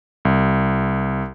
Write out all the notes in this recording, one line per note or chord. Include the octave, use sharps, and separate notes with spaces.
C2